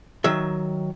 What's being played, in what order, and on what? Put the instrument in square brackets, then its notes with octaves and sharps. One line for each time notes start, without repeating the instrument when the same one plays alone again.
[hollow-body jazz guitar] D#3 F#3 E5